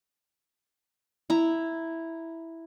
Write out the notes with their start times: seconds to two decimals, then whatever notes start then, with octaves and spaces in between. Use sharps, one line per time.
1.30 E4 A#5